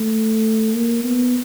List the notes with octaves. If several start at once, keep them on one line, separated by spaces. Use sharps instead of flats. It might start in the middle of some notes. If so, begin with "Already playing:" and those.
Already playing: A3
A#3
B3